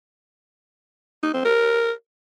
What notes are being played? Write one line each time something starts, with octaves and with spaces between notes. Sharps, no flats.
D#4
C4
A#4